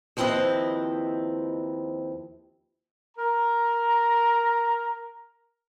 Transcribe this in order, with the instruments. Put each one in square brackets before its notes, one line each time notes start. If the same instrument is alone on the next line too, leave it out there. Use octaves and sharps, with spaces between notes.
[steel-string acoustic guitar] D#2 F3 C4 E4 B4 D#5
[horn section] A#4 A#5